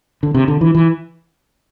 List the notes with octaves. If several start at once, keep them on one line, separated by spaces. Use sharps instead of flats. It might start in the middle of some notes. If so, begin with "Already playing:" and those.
D3
C3
D3
E3
E3